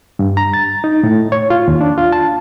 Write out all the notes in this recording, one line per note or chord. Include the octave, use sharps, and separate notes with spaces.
G2
A#5
A6
D#4
A2
C#5
F4
D#2
D4
F4
A5